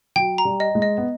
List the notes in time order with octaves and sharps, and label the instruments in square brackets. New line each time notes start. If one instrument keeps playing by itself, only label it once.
[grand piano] F#3 [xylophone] G5
[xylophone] A#5
[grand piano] G3
[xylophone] D#5
[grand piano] G#3
[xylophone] D#5
[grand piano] B3